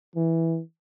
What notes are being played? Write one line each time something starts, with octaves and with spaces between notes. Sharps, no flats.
E3